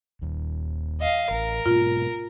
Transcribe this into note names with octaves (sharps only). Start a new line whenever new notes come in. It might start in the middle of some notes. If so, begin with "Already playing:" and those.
D#1 D#2
D#5 F5
A1 A#4
G#2 B2 F4